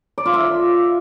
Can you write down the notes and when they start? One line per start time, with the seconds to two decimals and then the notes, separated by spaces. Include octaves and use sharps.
0.18 D5
0.26 F4
0.33 E5